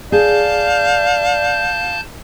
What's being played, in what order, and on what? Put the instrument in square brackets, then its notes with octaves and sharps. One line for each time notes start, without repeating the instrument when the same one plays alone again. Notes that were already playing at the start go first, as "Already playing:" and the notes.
[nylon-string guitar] G#4 [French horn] D5 [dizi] F5 [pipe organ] A5 G6